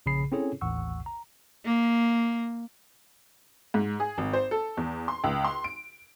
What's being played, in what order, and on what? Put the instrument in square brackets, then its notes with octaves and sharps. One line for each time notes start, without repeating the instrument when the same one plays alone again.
[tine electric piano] A#1 C#3 G#4 B5 C7
C4 C#4 E4 G#4 A4 C#5
A1 D#2 F#5 C#6 E6
A#5
[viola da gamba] A#3
[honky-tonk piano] G#2
G#4
G#1
C5
A4
E2
C6
C#2
C6
D7